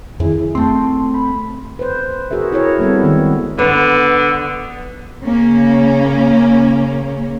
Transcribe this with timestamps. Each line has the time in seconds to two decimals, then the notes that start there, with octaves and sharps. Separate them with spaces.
0.20 F2 D#3 E4 G#4
0.55 A3 C4 A5 C6
1.14 B5
1.79 B4 C5
2.31 F#4 G#4 A#4 E5
2.52 E4 G#4 A#4 C#5
2.79 G3 B3 C4 A4
3.03 D#3 G#3 B3
3.59 D3 B3 B4
5.23 C#3 A#3 C#4